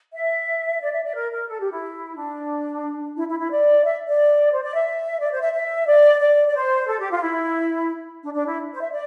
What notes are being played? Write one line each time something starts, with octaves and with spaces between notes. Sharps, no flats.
E5
D5
E5
D5
A#4
A#4
A4
G4
E4
D4
E4
E4
E4
D5
E5
D5
C5
D5
E5
D5
C5
E5
E5
D5
D5
D5
C5
A4
G4
F4
E4
D4
D4
E4
C5
E5
D5